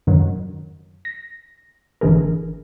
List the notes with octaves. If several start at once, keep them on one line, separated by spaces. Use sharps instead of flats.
F#2 D#3 F#3
A#6
G1 D3 E3 G#4 A#4